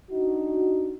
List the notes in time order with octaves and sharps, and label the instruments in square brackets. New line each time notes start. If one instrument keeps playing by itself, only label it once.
[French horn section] D4 D#4 F#4